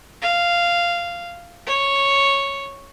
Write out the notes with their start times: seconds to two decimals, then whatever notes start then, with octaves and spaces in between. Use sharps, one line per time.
0.22 F5
1.66 C#5